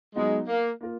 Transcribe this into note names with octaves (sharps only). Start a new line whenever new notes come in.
F#3 G#3 B3 D#4
A#3
A#3 F4 A#4